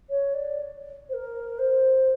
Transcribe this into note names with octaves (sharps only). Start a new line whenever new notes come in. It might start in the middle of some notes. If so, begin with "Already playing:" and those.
C#5
D5
C5
A#4
C5